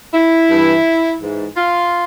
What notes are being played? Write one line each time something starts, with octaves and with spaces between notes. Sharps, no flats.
E4
G2 E3
G#2 E3
F4